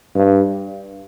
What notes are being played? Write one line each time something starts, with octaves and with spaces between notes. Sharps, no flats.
G2